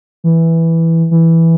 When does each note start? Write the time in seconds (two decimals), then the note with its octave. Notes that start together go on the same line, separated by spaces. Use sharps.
0.24 E3
1.11 E3